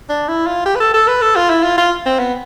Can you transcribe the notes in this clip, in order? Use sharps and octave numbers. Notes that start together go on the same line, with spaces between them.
D4
E4
F4
G4
B4
A4
A4
B4
A4
F4
E4
F4
F4
C4
B3